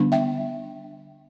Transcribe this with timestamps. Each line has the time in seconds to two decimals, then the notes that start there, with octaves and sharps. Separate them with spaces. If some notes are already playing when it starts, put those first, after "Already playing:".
Already playing: D3 G3 B3 D4
0.12 E5 G5